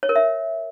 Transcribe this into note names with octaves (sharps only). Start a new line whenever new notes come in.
C#5
A#4
E5